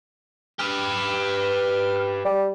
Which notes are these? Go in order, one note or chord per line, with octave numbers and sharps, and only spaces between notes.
G4 B4 F6
G3